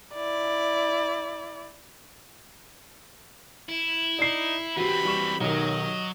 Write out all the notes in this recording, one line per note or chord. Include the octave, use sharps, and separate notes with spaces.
E4 D5
E4
D#4 D5 C7
E3 C4 F#4 G4 B5
G3 C#6 E7
B1 D#3 F#3 D#5